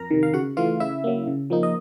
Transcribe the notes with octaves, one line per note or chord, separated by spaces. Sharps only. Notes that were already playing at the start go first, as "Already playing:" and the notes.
Already playing: F2 A#4 A#5
C3 D#3
F5
C#3 F#4 F#5
E3 A3 F4 F5
C#3 E4 E5
F#3 A#3
C#3
F3 A#3 D#4
D#5